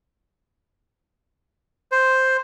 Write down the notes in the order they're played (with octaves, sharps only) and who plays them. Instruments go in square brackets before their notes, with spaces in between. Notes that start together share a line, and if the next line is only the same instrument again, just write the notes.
[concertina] C5